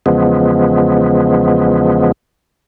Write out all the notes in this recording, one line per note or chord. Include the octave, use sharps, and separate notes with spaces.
E2 C#3 F3 G#3 B3